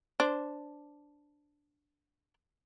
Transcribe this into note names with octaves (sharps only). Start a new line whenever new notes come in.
D4 C5